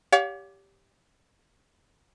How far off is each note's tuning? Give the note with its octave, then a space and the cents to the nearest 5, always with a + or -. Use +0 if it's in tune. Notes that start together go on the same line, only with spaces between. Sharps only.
G4 +0 C#5 +40 F5 +35